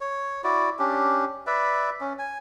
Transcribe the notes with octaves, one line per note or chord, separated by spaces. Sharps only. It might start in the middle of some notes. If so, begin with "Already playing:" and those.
C#5
E4 F#4 D5
C#4 D4 G4
B4 D5 E5
C#4
G#5